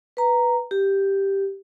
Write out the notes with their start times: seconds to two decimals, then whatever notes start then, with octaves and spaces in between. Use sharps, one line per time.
0.17 B4 A#5
0.71 G4